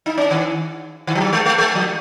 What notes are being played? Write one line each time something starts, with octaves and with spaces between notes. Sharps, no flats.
D#4
C#4
D#3
D#3
F3
F#3
G#3
G#3
G#3
F3